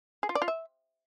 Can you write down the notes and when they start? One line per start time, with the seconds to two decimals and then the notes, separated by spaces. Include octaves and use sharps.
0.23 G#4
0.29 F4
0.35 D5
0.42 F4
0.48 E5